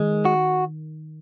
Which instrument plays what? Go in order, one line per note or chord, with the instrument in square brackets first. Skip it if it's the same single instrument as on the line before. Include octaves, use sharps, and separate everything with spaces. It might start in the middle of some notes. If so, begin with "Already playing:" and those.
Already playing: [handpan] D#3 [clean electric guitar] G#3
[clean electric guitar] F#4